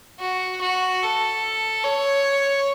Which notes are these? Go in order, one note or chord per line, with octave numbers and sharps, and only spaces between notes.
F#4
F#4
A4
C#5